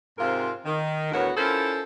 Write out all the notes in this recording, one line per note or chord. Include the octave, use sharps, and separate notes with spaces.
G#2 C3 C4 F4 A#4 F5
D#3
D2 A2 B3 F#4 A#4 C#5
C#4 E4 F4 A4 A#4 C5